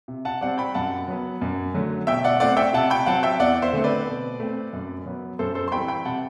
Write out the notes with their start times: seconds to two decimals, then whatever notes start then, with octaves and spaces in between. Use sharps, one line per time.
0.08 C3
0.25 F#5 A5
0.41 G3 C4 D5 F#5
0.58 G5 B5
0.74 F#2 F#5 A5
1.08 F#3 B3
1.42 F#2
1.74 D3 F#3 A3
2.07 B2 E5 G5
2.24 D5 F#5
2.40 A3 C4 D5 F#5
2.57 E5 G5
2.73 C3 F#5 A5
2.90 G5 B5
3.06 F#3 C4 F#5 A5
3.23 E5 G5
3.40 E2 D5 F#5
3.62 C5 E5
3.73 D3 A3 C4
3.84 B4 D5
4.07 B2
4.40 A3 C4
4.73 F#2
5.06 F#3 B3
5.39 F#2 A4 C5
5.55 A4 C5
5.68 C6
5.72 E3 G3 C4 G5 B5
5.88 G5 B5
6.05 C3 F#5 A5